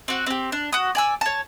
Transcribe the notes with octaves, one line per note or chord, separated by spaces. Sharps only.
C4 F#4
C4 G4
D4
F#4 D#6
D5 G#5 E6
C#5 A5